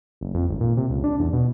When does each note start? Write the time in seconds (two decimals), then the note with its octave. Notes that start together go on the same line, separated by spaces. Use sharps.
0.21 F#1
0.34 F2
0.49 G#1
0.60 A#2
0.77 C3
0.90 C#2
1.04 D4
1.20 E2
1.33 B2